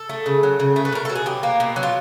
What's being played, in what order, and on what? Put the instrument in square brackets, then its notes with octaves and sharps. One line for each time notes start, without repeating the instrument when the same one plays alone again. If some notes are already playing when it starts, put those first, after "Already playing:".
Already playing: [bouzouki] A4
A3
C#3
F#3
C#3
A3
B4
B2 A#4
F#3 A4
G#4
B2 G4
A#3
B2
F#3
F4